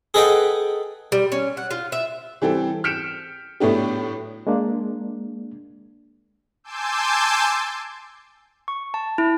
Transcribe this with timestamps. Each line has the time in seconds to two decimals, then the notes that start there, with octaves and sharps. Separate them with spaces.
0.14 G#4 A4 B4 D#5 F#5 G5
1.12 G3
1.32 C#4
1.57 F#5
1.71 F4
1.92 E5
2.42 E3 G3 C4 G4 A4
2.84 F6 G6 B6 C#7 D7 E7
3.60 A2 F#3 A3 B3 D4 G4
4.47 G#3 A#3 D4
6.64 G#5 A5 C6 D6 E6 G6
8.68 C#6
8.94 A5
9.18 E4